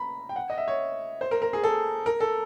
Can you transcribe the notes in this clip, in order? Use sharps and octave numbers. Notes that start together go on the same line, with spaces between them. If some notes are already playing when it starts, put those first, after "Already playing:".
Already playing: A#5 B5
G5
F#5
D#5
E5
C#5
C5
A#4
A#4
G#4
A4
A#4
A4